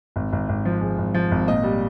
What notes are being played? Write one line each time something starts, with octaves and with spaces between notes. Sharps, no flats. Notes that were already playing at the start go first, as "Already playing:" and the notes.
G#1
G#1
G#1
F3
G#1 G#4
G#1
F3
G#1
A#2 D#5
G3